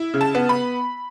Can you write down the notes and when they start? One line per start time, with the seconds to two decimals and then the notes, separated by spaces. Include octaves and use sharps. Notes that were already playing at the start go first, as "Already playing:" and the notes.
Already playing: E4
0.14 C#3
0.21 A5
0.35 B3
0.49 B5